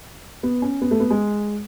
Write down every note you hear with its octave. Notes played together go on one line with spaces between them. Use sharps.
B3
C#4
B3
A3
B3
G#3